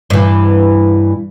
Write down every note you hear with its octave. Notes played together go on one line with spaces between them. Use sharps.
G2 E3